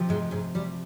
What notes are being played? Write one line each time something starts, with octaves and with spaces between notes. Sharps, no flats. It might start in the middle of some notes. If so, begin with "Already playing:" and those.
Already playing: C3 F3
G#2 G#3
G#2 G#3
G3